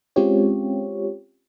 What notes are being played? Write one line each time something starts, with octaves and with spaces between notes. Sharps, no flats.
G#3 C4 C#4 F4 G4 C#5